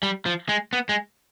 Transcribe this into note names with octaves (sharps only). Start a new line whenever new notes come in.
G3
F3
G#3
B3
G#3